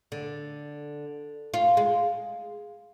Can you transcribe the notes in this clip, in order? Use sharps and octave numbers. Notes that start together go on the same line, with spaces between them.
D3
F4
G#3